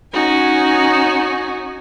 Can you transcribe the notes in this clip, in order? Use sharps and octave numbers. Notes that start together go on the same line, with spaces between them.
C#4 D#4 F#4 G#5